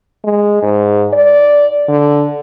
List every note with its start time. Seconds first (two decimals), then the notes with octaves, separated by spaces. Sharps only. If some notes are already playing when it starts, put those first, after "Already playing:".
0.24 G#3
0.62 G#2
1.13 D5
1.88 D3